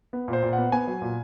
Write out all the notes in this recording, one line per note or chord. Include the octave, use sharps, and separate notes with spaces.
B3
A#2
C5
A#2
F#5
B3
B3 G#5
F#3
A#2